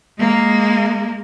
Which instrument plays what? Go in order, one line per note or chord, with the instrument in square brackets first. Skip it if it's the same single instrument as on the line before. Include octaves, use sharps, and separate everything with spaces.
[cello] G#3 A#3